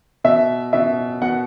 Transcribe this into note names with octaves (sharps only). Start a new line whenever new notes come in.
B2 E5
B2 E5
B2 F#5